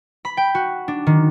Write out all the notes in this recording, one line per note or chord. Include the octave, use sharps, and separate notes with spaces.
B5
G5
F#4
D4
D#3